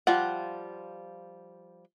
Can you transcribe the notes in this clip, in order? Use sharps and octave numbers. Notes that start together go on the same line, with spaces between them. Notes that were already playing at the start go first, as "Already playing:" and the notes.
F3 G3 F4 F#5